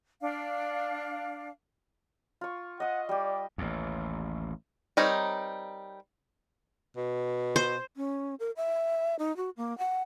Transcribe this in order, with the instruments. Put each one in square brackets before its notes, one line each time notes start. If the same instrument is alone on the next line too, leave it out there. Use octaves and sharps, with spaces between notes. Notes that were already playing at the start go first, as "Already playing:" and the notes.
[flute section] D4 F5
[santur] F4 C#6
[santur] D#5 D#6 [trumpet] F#5
[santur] G3 G4 [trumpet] D5
[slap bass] A1 D#2
[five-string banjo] G3 C4 D#4 A#4 C#5
[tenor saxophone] B2
[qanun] C5
[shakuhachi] C#4
A#4
E5
D#4
F#4
A#3
F#5